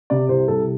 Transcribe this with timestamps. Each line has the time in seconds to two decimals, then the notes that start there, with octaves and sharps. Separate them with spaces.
0.10 C3 D5
0.29 C2 C5
0.48 G3 A4